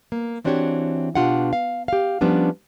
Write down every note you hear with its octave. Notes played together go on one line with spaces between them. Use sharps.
A#3
E3 C4 D4 F#4 G4 C#5
B2 D#3 D4 F4 G4 F#5
F5
G4 F5
F3 G3 B3 C#4 D4